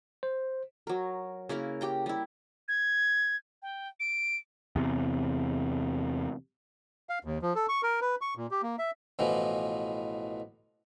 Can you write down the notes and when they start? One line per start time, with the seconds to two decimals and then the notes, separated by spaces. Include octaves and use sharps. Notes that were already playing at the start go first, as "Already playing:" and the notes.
0.23 C5
0.87 F#3 A#4
1.49 C#3 A#3 E4 A#4
1.81 G4 G5 A#5
2.06 G3 E4
2.68 G#6
3.62 G5
4.00 D7
4.76 E2 C3
7.09 F5
7.25 D#2
7.42 F3
7.55 A4
7.69 C#6
7.83 A#4
8.01 B4
8.21 C#6
8.37 A#2
8.51 G4
8.63 A#3
8.79 E5
9.19 A1 B2 E3 F3